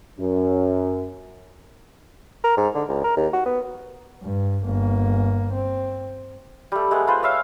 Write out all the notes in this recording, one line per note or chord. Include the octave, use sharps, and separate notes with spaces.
F#2
A#4
G#2
D3
C#2
A#4
D#2
F#4
B3
G2
G1 A#3
C4
G3 A3
G#3 A3 B3
F4 B4 C5
C#5 E5 F5